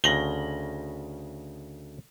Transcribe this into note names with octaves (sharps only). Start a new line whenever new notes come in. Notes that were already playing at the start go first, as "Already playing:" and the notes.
D2 C#3 A#6 F#7 G7